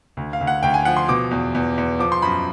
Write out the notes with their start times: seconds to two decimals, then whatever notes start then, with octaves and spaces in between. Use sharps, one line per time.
0.17 D2
0.33 F5
0.41 D2
0.47 F#5
0.63 D2 G5
0.74 G#5
0.85 F3 F#5
0.97 C6
1.08 B2 D6
1.31 E2
1.55 E2
1.78 E2
1.99 F3 D6
2.12 C6
2.22 F#2 B5